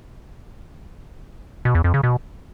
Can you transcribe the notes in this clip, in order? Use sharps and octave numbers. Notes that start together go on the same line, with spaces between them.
B2
E2
F2
C#3
B2